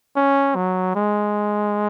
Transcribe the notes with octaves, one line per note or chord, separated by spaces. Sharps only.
C#4
F#3
G#3